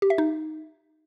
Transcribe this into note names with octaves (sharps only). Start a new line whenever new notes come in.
G4
E5
D#4